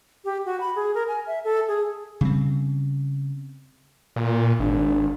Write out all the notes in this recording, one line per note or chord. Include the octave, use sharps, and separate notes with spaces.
G4
F#4
B5
G#4
A#4
G#5
E5
A4
G#4
C#3 G3 C4
A#2
G#1 D4